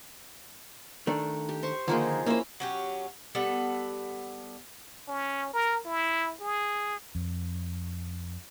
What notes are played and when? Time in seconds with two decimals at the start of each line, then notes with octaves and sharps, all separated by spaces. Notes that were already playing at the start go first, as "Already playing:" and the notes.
1.07 D#3 A3 D4
1.49 G4
1.63 C5 C#6
1.88 D3 D#3 F3 A#3 D#4 G#4
2.26 A#3 C#4 E4 C5
2.60 F#3 C#4 G4
3.35 G3 B3 A4
5.08 C#4
5.53 A#4
5.85 E4
6.40 G#4
7.15 F2